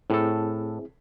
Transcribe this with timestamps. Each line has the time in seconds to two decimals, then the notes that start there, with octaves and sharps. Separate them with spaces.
0.10 A2 C4 E4 G#4 A4